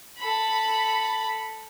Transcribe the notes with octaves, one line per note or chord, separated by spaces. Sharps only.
A4 B5